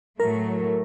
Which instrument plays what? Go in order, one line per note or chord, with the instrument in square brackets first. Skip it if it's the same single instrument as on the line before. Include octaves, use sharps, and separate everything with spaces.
[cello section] A2 F#3 A3 [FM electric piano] A#4